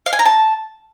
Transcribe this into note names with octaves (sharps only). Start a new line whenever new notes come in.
F5
G#5
A#5
A5